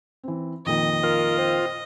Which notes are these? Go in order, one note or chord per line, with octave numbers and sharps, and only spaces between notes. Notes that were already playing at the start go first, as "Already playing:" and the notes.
E3 C4
F2 A#2 D#3 D#5
F4 A#4
C4